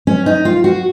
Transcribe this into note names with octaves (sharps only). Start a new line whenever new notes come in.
C#4
D#4
F4
F#4